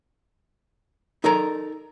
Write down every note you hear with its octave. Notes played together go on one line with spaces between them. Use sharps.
D#4 A4 A#4 A#5